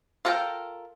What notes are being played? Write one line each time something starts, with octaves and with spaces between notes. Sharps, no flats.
F4 A4 A#4 E5 G5